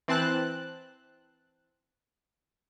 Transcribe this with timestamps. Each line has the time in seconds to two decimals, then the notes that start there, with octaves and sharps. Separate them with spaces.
0.08 E3 C4 A5 F#6